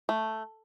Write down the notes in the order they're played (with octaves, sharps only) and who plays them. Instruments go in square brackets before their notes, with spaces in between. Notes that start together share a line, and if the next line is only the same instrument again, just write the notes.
[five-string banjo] A3